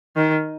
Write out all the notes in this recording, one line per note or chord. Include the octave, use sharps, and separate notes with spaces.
D#3